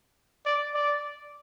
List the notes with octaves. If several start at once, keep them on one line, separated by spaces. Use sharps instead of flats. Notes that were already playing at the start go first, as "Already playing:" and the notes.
D5
D5